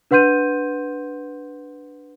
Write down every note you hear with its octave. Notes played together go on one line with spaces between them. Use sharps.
D4 B4 F#5 C6 G6 D#7